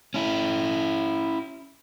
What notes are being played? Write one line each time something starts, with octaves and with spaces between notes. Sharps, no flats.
C#4 E4